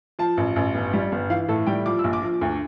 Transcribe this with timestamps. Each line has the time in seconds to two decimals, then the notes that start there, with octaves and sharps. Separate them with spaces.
0.19 F3 A5
0.37 A1
0.56 A1
0.75 G1
0.94 G3
1.12 G1
1.30 E3 F5
1.48 A2 A4
1.67 G3 G5
1.86 F3 D6
1.99 E6
2.04 A#1
2.13 D6
2.22 F3
2.41 D2